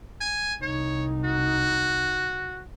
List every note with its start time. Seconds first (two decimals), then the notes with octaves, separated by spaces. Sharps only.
0.21 G#5
0.62 C2 D#4 C#5
1.25 F#4